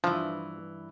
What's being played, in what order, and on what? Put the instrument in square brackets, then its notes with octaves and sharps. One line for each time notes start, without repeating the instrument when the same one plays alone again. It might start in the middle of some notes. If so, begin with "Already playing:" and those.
[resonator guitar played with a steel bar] G2 E3 [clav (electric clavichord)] F3